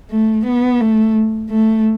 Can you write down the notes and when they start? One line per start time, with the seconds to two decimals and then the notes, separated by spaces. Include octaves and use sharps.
0.10 A3
0.46 B3
0.80 A3
1.50 A3